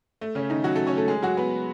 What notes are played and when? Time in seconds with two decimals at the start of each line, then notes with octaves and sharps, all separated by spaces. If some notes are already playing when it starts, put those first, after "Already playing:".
0.21 A3
0.35 C#3 C#4
0.50 D#3 D#4
0.64 F#3 F#4
0.75 A3 A4
0.87 C#4 C#5
0.97 A3 A4
1.08 G#3 G#4
1.22 F#3 F#4
1.37 B3 B4